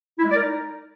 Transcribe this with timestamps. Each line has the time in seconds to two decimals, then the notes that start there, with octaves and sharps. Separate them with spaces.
0.18 E4
0.24 G#3
0.30 D5
0.35 A#4
0.41 D#4